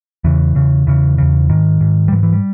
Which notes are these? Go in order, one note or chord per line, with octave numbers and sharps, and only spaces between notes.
E2 C#3 E3
E2 C#3
E2 C#3 E3
E2 C#3
G#2 D#3
G#2
G3
G#2 E3
E3
G3